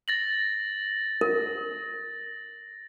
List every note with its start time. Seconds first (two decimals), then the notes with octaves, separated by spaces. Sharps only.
0.08 A6 A#6 F#7
1.21 A#4